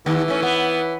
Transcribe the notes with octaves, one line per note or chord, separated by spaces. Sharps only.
D#2 E3
A3 C#4
B3